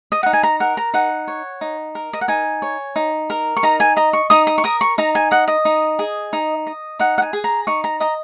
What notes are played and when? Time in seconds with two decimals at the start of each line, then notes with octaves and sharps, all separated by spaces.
0.12 D#5
0.23 D#4 F#5
0.33 G#5
0.43 A#5
0.60 A#4 F#5
0.77 A#5
0.94 D#4 F#5
1.28 C#5
1.61 D#4
1.95 A#4
2.13 D#5
2.21 F#5
2.28 D#4 G#5
2.62 C#5
2.96 D#4
3.30 A#4
3.57 C#6
3.63 D#4 A#5
3.80 G#5
3.96 D#5 A#5
4.13 C#6
4.30 D#4 D#6
4.47 D#6
4.58 C#6
4.64 A#4 D#6
4.81 C#6
4.98 D#4 A#5
5.15 G#5
5.31 D#5 F#5
5.48 D#5
5.65 D#4
5.99 G#4
6.33 D#4
6.67 D#5
6.99 D#4 F#5
7.18 F#5
7.22 G#5
7.33 G#4
7.44 A#5
7.67 D#4 C#6
7.84 A#5
8.00 D#5 A#5